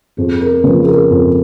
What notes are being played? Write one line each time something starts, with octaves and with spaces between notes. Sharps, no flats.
F2 G#4
A#4
C#3 F3 B4
G#4
A#4
F2